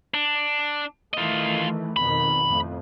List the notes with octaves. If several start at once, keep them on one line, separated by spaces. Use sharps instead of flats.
D4
D#3 E3 A3 F4 D#5
F2 B2 D#3 B5
F2 A2